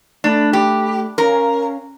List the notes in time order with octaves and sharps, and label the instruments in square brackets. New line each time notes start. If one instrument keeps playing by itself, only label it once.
[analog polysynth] A3 B5 [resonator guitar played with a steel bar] D4
[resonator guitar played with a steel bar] G4
[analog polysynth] C#4 F5 [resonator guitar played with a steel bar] A#4